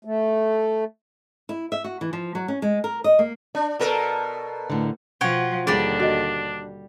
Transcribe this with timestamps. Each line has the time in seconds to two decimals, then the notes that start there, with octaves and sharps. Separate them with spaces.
0.05 A3
1.49 E4
1.72 E5
1.84 F#4
2.01 E3
2.13 F3
2.35 F#3
2.48 C#4
2.62 G#3
2.84 A#4
3.04 D#5
3.19 A#3
3.55 D4 D5
3.79 B2 A4 A#4
4.70 A2 D3
5.21 B2 F3 F#4 C#5 G5
5.67 D#2 D3 G3 D4 G#4 D5
6.00 F#4 D#5